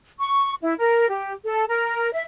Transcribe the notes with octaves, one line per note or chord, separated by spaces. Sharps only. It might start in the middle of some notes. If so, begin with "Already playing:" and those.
C#6
E4
A#4
G4
A4
A#4
E5